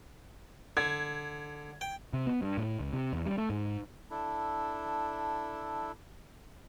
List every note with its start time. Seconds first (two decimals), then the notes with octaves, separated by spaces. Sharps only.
0.77 D3 G#6
1.81 G5
2.13 C3
2.27 B3
2.42 G2
2.58 A2
2.80 C#2
2.93 C3
3.13 E2
3.26 G3
3.38 A3
3.50 G#2
4.11 D4 E4 A4